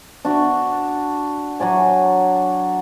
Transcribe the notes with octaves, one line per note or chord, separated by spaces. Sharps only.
D4 F#4
F#3 F#4 D5 G#5